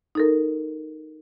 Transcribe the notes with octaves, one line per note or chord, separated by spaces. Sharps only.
D#4 A4 A#4